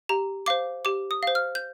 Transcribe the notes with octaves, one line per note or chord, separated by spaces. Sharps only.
G4 A#5
C5 F5 D6
G4 D6
D#6
C5 F5
F6
G6